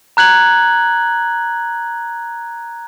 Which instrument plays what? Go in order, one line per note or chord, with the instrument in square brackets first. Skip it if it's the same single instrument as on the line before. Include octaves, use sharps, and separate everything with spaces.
[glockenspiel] A#5 F#6 G#6 F#7